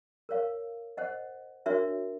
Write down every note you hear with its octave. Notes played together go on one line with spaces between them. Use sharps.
A#4 C#5 F5
C5 D#5 F#5
D4 F#4 A#4 C#5 E5